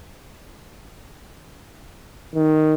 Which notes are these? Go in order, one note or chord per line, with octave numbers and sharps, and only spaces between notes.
D#3